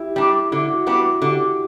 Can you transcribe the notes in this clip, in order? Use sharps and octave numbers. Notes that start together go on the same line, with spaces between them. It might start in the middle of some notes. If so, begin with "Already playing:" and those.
Already playing: E4 G4
G3 D4
D3 E4
F#4
G3 B3 D4 F#4
D3 G4